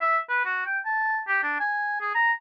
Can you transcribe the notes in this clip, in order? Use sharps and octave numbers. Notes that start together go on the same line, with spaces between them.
E5
B4
F#4
G5
A5
G4
D4
G#5
G#4
A#5